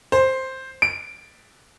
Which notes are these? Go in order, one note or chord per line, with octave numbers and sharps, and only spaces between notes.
C5
D7